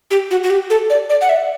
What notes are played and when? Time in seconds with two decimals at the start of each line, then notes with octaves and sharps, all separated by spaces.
0.11 G4
0.31 F#4
0.44 F#4
0.50 G4
0.70 A4
0.90 D5
1.10 D5
1.21 F#5
1.29 E5